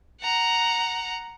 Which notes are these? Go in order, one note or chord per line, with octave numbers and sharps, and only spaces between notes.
F#5 A#5